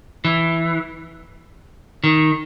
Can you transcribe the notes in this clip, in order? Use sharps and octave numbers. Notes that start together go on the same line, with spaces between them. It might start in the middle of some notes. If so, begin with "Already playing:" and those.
E3
D#3